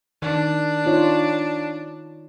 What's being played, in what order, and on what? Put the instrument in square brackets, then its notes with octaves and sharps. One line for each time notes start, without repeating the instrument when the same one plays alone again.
[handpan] D#3 [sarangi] D4
[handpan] D#4 F4 C#5